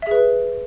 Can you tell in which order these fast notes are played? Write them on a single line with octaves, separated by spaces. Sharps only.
E5 G#4 B4